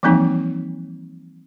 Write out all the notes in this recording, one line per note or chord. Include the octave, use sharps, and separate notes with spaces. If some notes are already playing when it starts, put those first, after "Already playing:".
E3 F3 G3 A#3 C4 D#4